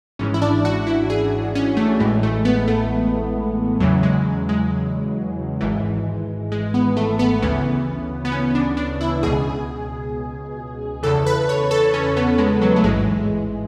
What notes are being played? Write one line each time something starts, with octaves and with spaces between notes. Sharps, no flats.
G#1 G#2 E3 C#4
E4
D4
F#4
E4
G#4
C#4
A3
A1 A2 E3 G#3
A3
B3
A3
E2 C#3 E3 F#3
G#3
G#3
G#1 G#2 E3
G#3
B3
A3
B3
D2 C#3 E3 B3
B3
C#4
D4
D4
E4
C#2 B2 G#4
E2 C#3 E3 A4
B4
C#5
A4
C#4
B3
G#3
F#3
A3
A1 G#2 E3 G#3